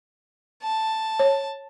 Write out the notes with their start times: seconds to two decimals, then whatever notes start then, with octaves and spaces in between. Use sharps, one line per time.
0.63 A5
1.19 C#5